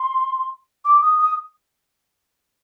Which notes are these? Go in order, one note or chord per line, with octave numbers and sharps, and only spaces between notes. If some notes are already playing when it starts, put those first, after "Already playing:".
Already playing: C6
D6
D#6
D#6